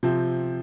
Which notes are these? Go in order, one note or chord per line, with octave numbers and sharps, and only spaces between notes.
C3 F3 C4